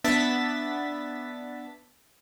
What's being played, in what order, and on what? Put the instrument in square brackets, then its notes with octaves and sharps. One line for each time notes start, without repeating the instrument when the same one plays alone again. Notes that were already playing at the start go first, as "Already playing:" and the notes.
[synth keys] B3 D4 E5 A6 B6